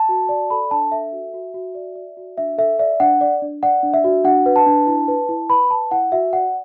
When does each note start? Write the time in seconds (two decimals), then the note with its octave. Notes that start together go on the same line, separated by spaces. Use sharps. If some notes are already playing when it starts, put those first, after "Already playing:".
Already playing: A5
0.09 F#4
0.29 D5
0.50 A4 B5
0.71 D4 A5
0.92 A4 E5
1.13 F#4
1.34 F#4
1.54 F#4
1.75 D5
1.96 D5
2.17 F#4
2.38 D4 E5
2.58 A4 E5
2.79 D5 E5
3.00 D4 F#5
3.21 D5
3.42 D4
3.63 D5 F#5
3.83 D4
3.94 E5
4.04 F#4
4.24 D4 F#5
4.46 B4
4.56 A5
4.66 D4
4.87 E4
5.08 B4
5.29 E4
5.50 B4 B5
5.70 B4 A5
5.91 E4 F#5
6.12 F#4 E5
6.33 D5 F#5